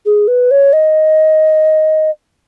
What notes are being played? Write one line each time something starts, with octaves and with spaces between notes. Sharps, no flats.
G#4
B4
C#5
D#5